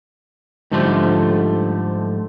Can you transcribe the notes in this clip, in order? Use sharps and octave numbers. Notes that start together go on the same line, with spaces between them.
G#2 D3 F3 G3 A3